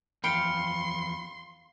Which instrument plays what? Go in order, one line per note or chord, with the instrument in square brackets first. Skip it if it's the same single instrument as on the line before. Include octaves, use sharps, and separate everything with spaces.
[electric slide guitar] E2 F3 [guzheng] F5 G5 [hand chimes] B5 C#7 [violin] C6